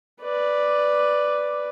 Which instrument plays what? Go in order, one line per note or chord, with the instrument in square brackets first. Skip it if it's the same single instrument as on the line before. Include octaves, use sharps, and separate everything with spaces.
[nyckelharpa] B4 D5